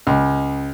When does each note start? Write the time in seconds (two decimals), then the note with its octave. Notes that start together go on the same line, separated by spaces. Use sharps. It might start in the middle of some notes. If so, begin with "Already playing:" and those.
0.07 C#2